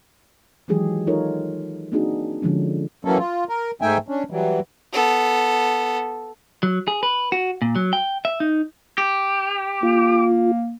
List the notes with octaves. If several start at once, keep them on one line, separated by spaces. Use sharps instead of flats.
D#3 E3 F#3 G#3 G4 G#4
D#4 F4 A4 A#4 C#5
A#3 C4 D4 D#4 F#4 G#4
D3 F3 G#3 C#4
E3 F#3 A#3 C#4 A4
F4
A#4
G#2 A3 D#4 E5 G5 G#5
C#4 D4
E3 F#3 G3
B3 A4
F#3
G#4
B4
F#4
A#2
F#3
G5
E5
D#4
G4
A#3 F4